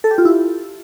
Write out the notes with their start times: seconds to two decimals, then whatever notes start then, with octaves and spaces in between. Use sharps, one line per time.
0.04 A4
0.11 G4
0.18 F4
0.25 E4